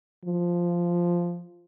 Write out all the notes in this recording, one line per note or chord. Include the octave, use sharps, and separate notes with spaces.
F3